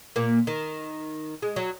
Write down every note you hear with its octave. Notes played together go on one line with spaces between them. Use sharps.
A#2 A#3
D#3
G#3
F#3